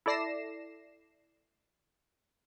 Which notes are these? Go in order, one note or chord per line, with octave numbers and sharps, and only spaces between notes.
E4 A4 D5 A#6 C7 E7